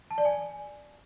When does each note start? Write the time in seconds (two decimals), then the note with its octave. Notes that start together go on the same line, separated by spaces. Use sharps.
0.11 A5
0.18 D5
0.25 G#5